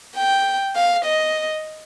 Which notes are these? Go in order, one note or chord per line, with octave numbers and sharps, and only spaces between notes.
G5
F5
D#5